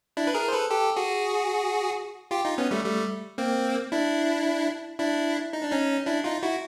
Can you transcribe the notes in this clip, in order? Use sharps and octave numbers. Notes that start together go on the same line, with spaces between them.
D4 E4
B4
G#4 A#4
C5
A4 B4
G4 A4
F#4 G#4
F4 G4
D#4 F4
B3 C#4
G3 A3
G3 A3
A#3 C4
D4 E4
D4 E4
D#4
D4
C#4 D#4
D4 E4
D#4 F4
E4 F#4